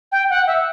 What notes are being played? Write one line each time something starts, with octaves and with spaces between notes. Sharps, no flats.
G5
F#5
E5